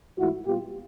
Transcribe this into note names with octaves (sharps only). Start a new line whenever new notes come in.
G#2 E3 A3 E4 F#4
A#2 G3 B3 F4 G4